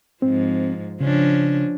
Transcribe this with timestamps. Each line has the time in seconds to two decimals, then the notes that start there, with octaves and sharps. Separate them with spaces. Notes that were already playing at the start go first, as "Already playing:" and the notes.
0.22 G#2 F3 C4
1.01 C#3 F3 C#4 D4